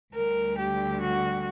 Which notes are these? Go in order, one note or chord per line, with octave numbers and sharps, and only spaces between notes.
D2 D3 G3 A#4
G4
F#4